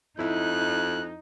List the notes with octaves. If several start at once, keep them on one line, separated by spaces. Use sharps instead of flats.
F2 D#4 E4 F#6